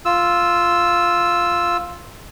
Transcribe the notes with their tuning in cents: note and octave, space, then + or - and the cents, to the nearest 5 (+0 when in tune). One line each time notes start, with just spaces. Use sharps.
F4 +0 E6 +0